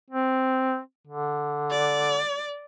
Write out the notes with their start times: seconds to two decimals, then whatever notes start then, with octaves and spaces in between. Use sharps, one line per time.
0.11 C4
1.07 D3
1.71 D5